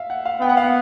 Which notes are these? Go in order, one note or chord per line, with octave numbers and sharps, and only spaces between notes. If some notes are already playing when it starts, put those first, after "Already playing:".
Already playing: E5 F5
F#5
F5
B3 G5
F#5
F5
F#5